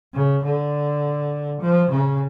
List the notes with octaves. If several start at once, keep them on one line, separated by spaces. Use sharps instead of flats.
C#3
D3
F3
C#3